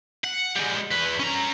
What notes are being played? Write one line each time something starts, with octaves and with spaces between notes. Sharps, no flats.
F#5
G3 G#3
E2 B4
C#4 A#5